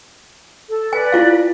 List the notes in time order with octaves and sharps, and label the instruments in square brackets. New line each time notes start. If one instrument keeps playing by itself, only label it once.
[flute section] A4
[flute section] B4 D5 [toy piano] G#5
[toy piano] E4 F4 F5